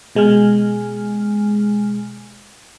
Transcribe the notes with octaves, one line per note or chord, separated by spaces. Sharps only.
B2 G#3 G#5 F6